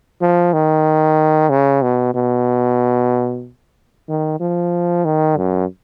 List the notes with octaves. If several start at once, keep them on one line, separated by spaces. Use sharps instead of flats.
F3
D#3
C#3
B2
B2
D#3
F3
D#3
F#2